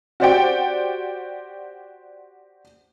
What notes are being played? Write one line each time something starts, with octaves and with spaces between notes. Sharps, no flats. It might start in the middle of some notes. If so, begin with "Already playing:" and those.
F#4 G4 C5 D5 F#5 G5